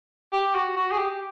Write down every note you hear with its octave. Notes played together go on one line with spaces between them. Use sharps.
G4
F#4
F#4
G#4
G4